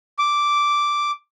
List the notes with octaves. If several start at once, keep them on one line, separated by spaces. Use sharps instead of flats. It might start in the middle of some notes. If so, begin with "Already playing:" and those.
D6